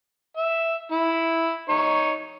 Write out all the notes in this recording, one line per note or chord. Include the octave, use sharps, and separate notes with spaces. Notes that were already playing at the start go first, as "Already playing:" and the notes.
E5
E4
D#4 C#5